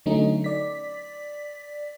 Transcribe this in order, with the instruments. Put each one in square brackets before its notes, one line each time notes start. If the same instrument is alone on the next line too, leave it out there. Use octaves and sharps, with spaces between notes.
[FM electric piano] D3 F#3 A3 C#4 D#4
D5 B6